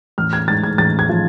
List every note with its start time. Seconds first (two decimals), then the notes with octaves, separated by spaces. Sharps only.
0.18 A1 F6
0.33 G#6
0.48 G#2 A6
0.63 G#6
0.78 A1 A6
0.99 G#6
1.09 F3